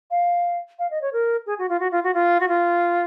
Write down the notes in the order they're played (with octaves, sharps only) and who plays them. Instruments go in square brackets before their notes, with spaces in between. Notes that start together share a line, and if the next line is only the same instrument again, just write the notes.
[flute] F5
F5
D#5
C#5
A#4
G#4
F#4
F4
F#4
F4
F#4
F4
F#4
F4